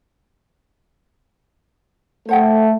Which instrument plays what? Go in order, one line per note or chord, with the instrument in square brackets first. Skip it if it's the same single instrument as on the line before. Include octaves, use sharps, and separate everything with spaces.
[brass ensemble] A3 [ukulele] C5 F#5 G5